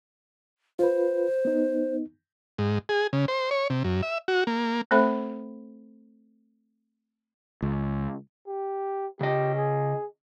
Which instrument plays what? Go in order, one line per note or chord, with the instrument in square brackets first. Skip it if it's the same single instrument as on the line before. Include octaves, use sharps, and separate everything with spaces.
[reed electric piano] F4 B4 [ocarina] C5
[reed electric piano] B3 D#4
[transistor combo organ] G#2
G#4
C#3
C5
C#5
C3
F#2
E5
F#4
A#3
[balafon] A3 C4 A4 C5 E5 B5
[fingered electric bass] C#2
[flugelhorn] G4
[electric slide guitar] C#3 D#5 [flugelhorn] G4
[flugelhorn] G#4